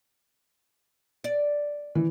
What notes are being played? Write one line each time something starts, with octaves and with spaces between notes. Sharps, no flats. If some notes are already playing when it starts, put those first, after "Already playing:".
D5
E3